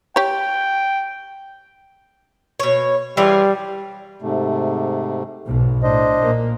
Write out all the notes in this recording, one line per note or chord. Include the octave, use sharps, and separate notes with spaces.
G4 C#5 G5
B2 C#5
E3 G3 F4 G#4
G#2 C3 A3
B1 G#2 B2
A2 D4 C5 D#5
A#2 A#3